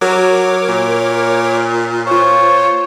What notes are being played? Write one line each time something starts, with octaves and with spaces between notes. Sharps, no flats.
F#3 A#4 C#5 D6
A#2
F4 C5 C#5